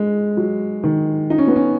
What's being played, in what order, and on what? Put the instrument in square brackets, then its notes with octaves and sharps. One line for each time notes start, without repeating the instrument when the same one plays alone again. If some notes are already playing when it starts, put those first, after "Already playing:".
Already playing: [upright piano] G#3
F#3
D#3
D#4
C#4
B3
C#4